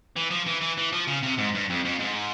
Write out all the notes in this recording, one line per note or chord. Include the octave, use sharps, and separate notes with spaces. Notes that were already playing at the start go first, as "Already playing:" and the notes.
E3
F3
E3
E3
E3
F3
C#3
C3
G#2
G2
F2
F2
G#2